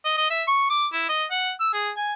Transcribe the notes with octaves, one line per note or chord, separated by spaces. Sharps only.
D#5
D#5
E5
C#6
D6
E4
D#5
F#5
E6
G#4
G#5